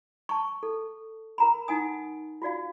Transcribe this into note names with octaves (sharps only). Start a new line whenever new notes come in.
A5 C#6
A4
A#4 A#5 B5
D#4 F#5 G#5 D#6
F4 F#4 D5 F5